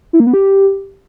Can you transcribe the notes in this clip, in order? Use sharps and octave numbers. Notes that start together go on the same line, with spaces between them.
E4
A#3
B3
G4